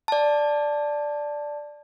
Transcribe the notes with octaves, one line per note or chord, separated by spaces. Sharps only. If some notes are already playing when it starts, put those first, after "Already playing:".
D5 A5